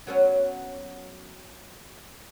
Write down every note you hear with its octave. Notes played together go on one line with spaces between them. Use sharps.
F#3 B3 C#4